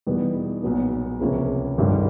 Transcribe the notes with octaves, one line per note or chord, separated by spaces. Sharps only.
E2 B2 G3 B3 D#4
B1 A#2 F#3 B3
C#2 C3 F3 A#3 C#4
G#1 G2 D3 G3